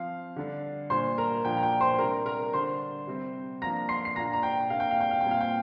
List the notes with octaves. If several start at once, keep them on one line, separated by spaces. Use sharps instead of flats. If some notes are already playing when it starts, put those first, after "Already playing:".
Already playing: F3 C4 F5
D3 G3 D4
A#2 G3 D4 C5 C6
A#4 A#5
A#2 F3 A#3 D4 G5
A#5
G5
C5 C6
C3 G3 D4 A#4 A#5
A#4 A#5
D3 G3 D4 C5 C6
C3 G3 C4
F3 A#3 D4 A#5 A#6
C6 C7
C7
A#2 A#3 D4 A#5 A#6
A#5
G5
C3 A#3 D4 F5
G5
F5
G5
F5
A#2 G3 C4 G5
F5
G5